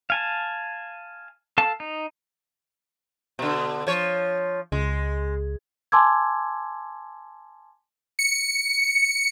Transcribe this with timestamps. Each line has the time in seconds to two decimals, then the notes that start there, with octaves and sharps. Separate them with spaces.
0.10 F5 G#5 A5
1.58 A4 F5 A5
1.80 D#4
3.39 B2 D3
3.87 F3 C#5
4.72 C#2 G#3
5.92 G#5 A5 C6 D6 E6 G#6
8.19 C#7